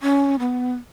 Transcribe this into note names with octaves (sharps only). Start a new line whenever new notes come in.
C#4
B3